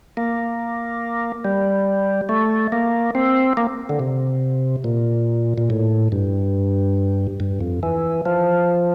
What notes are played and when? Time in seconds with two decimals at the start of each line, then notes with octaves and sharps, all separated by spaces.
0.17 A#3
1.45 G3
2.29 A3
2.72 A#3
3.15 C4
3.57 A#3
3.89 D3
3.99 C3
4.84 A#2
5.58 A#2
5.70 A2
6.12 G2
7.40 G2
7.61 F2
7.83 E3
8.26 F3